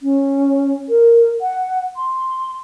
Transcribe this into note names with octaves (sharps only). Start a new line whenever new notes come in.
C#4
A#4
F#5
C6